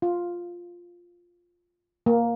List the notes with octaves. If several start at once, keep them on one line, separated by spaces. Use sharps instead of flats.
F4
A#3